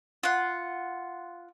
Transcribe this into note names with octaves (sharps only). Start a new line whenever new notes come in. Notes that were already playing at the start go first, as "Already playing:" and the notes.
F4 F#5